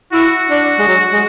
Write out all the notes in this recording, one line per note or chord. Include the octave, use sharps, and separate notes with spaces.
E4 F#4
D4
G#3
F#3
G#3